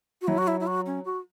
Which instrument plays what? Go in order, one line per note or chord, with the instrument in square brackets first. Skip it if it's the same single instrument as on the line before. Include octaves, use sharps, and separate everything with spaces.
[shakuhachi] F#4
[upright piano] F#3 [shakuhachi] E4
[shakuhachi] F#4
E4
E4
F#4
C#4
F#4